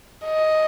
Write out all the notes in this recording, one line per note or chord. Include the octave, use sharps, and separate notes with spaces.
D#5